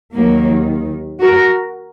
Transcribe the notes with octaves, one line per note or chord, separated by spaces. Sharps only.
D#2 D#3 F#3 A#3
F#4 A#4